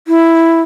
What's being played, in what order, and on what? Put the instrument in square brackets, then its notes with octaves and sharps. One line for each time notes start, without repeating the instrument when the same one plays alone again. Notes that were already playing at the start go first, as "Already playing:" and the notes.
[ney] E4